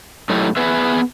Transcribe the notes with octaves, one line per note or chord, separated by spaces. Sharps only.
A2 F#3 A3 D#4 E4 G4
B3 G#4 B4 E5